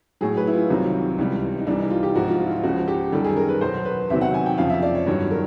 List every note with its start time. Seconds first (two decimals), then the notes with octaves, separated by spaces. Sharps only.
0.21 A2 F#3 G#4
0.37 B4
0.47 E4
0.53 F4
0.70 C2 C3 D#3 F#3
1.18 C#2 C3 E3 G3
1.58 D#4
1.67 C2 C3 E3 G3 D4
1.79 D#4
1.90 F4
2.03 G4
2.15 G#2 F3 F#4
2.28 F4
2.40 F4
2.46 E4
2.51 F4
2.63 C#2 C#3 F3 F#4
2.88 G4
3.12 F#2 D#3 G3 A4
3.24 G#4
3.37 A#4
3.49 B4
3.61 E2 B2 F#3 C5
3.85 B4
4.09 E2 C3 D#3 F#3 E5
4.21 F#5
4.34 G#5
4.46 G5
4.58 F2 C#3 F3 F5
4.70 E5
4.82 D5
4.95 C#5
5.06 G2 D#3 F#3 C#5
5.31 A#4